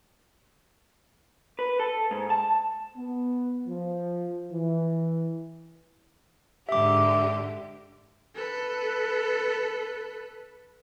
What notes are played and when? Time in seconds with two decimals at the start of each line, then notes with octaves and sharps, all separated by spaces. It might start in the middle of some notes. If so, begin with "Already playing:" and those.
1.59 B4
1.80 A4
2.11 G#2
2.30 A5
2.95 B3
3.67 F3
4.52 E3
6.69 G#2 D3 G4 E5 D6
8.35 A4 B4